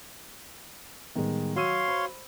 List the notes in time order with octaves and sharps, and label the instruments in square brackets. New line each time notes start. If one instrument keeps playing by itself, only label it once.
[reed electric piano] A2 G3 B3 [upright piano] D#3 G#3
[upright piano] F#3 E6 D#7 [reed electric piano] F#4 [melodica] C#5 F5 C6
[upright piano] C5 B5